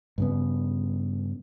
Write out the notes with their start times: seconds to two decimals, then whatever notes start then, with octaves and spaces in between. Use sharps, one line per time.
0.18 G2 C#3 B3